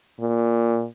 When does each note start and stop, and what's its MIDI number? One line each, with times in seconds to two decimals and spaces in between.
0.20 0.85 46